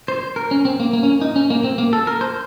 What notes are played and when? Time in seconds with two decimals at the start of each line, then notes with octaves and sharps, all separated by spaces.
0.08 C5
0.36 A#4
0.51 C#4
0.65 C4
0.80 A#3
0.93 A#3
1.03 C#4
1.21 D#4
1.36 C#4
1.50 A#3
1.64 C4
1.78 A#3
1.93 A4
2.07 A#4
2.21 C5